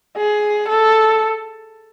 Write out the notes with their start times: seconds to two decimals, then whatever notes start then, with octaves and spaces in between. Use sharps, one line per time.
0.17 G#4
0.69 A4